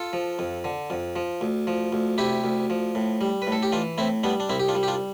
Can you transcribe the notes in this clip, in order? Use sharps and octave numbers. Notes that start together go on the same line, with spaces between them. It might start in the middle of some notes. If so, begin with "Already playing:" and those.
Already playing: F4 A4
F3
F2
D3
F2
F3
D2
F3
D2
C3 E4 G4
D2
F3
A2
G3
B4
A2
A4
G4
E3 D4 F4
A2 C4 E4
G3 B3 D4
D4
C2 C4 E4
G4
D4 F4
G3
G4
D4 F4